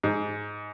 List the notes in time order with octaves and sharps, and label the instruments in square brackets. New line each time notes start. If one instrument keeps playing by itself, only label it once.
[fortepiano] G#2